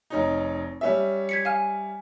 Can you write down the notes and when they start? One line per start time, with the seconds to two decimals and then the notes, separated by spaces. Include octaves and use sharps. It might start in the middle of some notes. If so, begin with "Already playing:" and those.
0.10 F1 C#4 D#4
0.81 G3 C#4 E5
1.29 G#6 B6 C#7
1.45 F5 G#5 F6